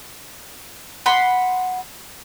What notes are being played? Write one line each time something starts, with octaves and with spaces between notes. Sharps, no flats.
F#5 B5 C6